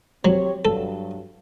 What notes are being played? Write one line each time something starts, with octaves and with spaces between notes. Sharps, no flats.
F#3 C4 G4 C#5
G2 F#3 A4